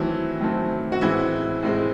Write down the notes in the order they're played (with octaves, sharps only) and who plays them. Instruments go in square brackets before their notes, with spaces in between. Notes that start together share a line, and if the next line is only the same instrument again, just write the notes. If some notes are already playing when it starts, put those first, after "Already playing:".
Already playing: [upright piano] D#3 E3 F#3 A3 C4 E4
D#3 F#3 A3 C4
F#4
A2 E3 G#3 C4 E4
A2 G#3 C4